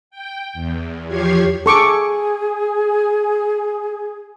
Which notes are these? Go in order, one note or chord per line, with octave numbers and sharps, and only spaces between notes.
G5
E2
E2 F3 G4 C#5 G#6 C7
G#4 A4 C#6 D6